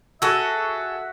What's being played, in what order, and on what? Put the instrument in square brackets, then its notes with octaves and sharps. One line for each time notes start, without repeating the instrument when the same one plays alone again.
[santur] F#4 F#5 [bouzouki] G#4 A4 [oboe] E5 [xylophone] E6